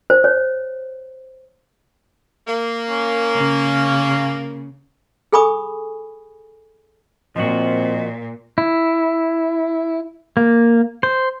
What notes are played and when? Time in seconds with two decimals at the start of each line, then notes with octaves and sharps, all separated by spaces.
0.10 C5
0.24 C#5
2.47 A#3
2.90 C#4
3.36 C#3
5.33 G#4 A4 G#5 B5 C#6 D#6
7.36 A#2 F3 C4 F#4 D#5
8.58 E4
10.37 A#3
11.03 C5